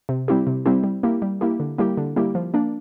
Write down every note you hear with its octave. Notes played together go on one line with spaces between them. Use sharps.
C3
G3 C4 E4 G4
C3
G3 C4 E4 G4
G3
A#3 E4 G4
G3
A#3 E4 G4
D3
G3 A#3 E4 G4
D3
G3 A#3 E4 G4
F3
A#3 D4